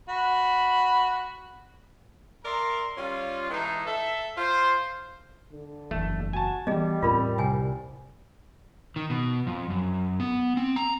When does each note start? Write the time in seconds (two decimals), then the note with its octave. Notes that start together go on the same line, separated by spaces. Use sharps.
0.09 F#4 B5
2.45 A#4 D5 E5 A#5 C6
2.98 G3 C#4 F4
3.50 E3 G#3 A3 D#4
3.86 A4 E5
4.37 F4 C5
5.52 D3
5.91 F#1 E2 A3
6.33 F#4 G#5 A5
6.67 E3 G3 B3 G#4 D#5
7.02 E2 A2 C4 F4 A#4 B5
7.38 C2 G5 G#5
8.96 D#3
9.10 B2
9.47 F2
9.70 F#2
10.20 B3
10.57 C4
10.76 A#5